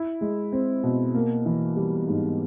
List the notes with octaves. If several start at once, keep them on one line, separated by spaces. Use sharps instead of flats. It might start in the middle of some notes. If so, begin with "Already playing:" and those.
Already playing: E4
G#3
C4
B2
A#3
E3
G3
G#2